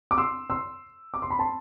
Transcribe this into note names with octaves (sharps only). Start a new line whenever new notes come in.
D6
C6 E6
C6 E6
D6
C6
B5
A5 C6